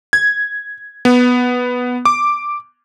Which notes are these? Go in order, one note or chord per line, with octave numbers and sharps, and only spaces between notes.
G#6
B3
D6